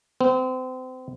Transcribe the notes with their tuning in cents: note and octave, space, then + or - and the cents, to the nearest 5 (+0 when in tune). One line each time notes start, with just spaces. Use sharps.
C4 -30